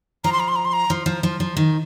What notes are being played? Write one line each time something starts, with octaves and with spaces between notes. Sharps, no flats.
F3 A#5
C6
A#5
C6
A#5
C6
A#5
F3
F3
F3
F3
D#3